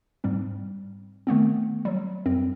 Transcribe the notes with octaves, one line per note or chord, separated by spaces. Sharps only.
G#2 G3 C4
D#3 A3 B3 C4
F#3 G3
F#2 C4